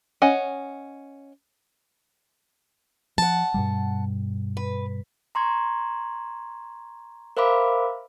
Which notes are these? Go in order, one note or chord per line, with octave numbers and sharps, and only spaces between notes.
C#4 D#5 F#5 G#5
F3 F#5 A5
G2 B2 G3
B4
A#5 C6 C#6 G#6
A#4 C5 E5 F5 B5 D6